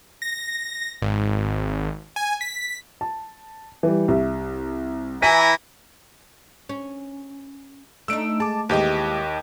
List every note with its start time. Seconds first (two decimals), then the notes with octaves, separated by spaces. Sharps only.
0.22 A#6
1.02 G#1
2.16 G#5
2.41 B6
3.01 A5
3.83 E3 G3
4.08 C2 E5
5.22 E3 E4 G#5 A#5 B6 D#7
6.69 C#4
8.08 A3 D4 D#4 E6 D7
8.40 G#3 A5 D6
8.69 D#2 E3 G#3 G4 D#5